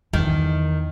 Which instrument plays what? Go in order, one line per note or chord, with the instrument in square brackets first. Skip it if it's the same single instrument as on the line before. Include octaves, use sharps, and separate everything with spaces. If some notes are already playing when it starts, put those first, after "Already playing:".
[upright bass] E2 [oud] D#3